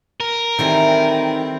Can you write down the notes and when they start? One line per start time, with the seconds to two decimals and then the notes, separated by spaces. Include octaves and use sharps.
0.20 A#4
0.59 D#3 E3 G3 C4 A4